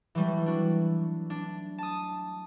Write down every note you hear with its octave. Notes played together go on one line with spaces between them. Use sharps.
E3 F#3 G3 A3
D4 F#4
D4
A5 D#6